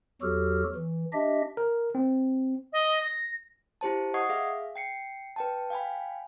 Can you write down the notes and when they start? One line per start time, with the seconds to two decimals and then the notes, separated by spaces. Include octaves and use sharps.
0.22 E2 F#3 F#4 G4 A4 F6
0.76 E3
1.13 D4 G4 D#5 E5
1.57 A#4
1.95 C4
2.73 D#5
3.03 A#6
3.81 E4 G4 C5 A5
4.14 D#5 F#5 C#6 D#6 G#6 C7
4.29 G#4 E5 F5
4.76 G5 C7 C#7
5.36 B4 G5 A5
5.70 F5 G5 G#5 B5